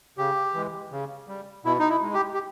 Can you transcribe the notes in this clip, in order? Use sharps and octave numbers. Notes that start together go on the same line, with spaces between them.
C#3 G4
E3 G#3
C#3
G3
B2 E4
D#4
E4
G#3
G4
G4